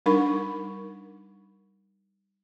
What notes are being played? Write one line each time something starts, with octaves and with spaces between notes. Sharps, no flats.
G3 D4 D#4 A#4 B5 C#6